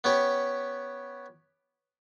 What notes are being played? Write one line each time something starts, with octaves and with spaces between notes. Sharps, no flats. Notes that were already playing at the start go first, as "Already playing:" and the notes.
B3 C#4 G4